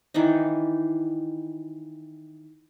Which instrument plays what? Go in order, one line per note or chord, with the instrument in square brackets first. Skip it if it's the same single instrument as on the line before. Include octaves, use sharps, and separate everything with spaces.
[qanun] D#3 E3 D4 D#4